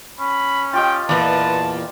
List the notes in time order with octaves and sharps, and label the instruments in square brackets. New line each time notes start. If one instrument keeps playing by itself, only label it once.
[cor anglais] C#4 [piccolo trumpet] B5
[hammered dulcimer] F4 G4 D#5 [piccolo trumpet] G5
[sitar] E2 A#2 [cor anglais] B4 [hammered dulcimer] D5 [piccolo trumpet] A5